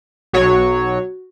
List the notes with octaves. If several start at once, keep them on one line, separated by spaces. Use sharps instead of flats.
B1 F#3 F#4 C#5